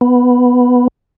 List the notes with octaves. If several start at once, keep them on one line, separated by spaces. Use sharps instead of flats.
B3